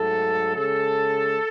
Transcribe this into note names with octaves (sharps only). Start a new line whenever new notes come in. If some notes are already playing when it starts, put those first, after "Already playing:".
Already playing: G#2 F#3 A3 A4
C#3 G#3 A4